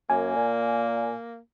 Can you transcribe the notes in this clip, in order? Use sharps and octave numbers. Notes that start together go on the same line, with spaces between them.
F#2 A#3 G#5
A#2